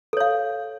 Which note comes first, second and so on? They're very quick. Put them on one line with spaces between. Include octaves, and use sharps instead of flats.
A4 C#5 F5